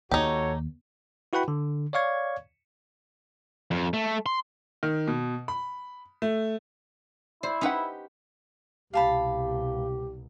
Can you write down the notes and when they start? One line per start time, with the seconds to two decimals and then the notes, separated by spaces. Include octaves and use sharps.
0.11 D#2 D#4 F#4 G4 A4 C#5
1.33 E4 F#4 B4 F#5 G5 B5
1.48 D3
1.93 C#5 D5 F5 C#6 G#6
3.71 F2
3.93 A3
4.26 C6
4.83 D#3
5.08 B2
5.48 B5
6.22 A3
7.43 E4 C5 D5
7.61 C#4 D#4 G4 B4 F#5
8.94 C2 B2 G4 F5 A5 B5